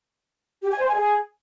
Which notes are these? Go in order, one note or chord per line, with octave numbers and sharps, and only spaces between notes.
G4
G#5
C5
G#5
G#4